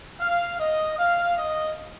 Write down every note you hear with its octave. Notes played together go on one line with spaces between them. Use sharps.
F5
D#5
F5
D#5